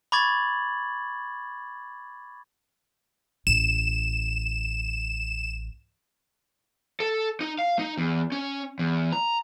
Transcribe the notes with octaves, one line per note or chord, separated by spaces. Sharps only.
B5 C#6 D6 G#6 A6 F#7
A1 E7
A4
D#4
F5
D#4
E2
C#4
E2
A#5